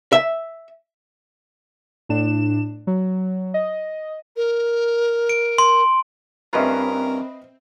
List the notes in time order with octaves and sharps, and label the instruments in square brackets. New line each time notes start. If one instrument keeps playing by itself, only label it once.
[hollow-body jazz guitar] E5
[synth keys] A2 D4 E7
F#3
D#5
[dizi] A#4
[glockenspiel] D7
C6
[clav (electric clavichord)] G2 C#4 F4 [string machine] C4 [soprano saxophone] A#4 [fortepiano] B4 D#5 E5